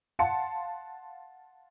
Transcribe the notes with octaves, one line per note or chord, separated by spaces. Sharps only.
F5 F#5 A5 C6 C#7